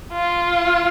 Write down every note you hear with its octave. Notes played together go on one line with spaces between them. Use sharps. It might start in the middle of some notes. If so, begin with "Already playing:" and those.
F4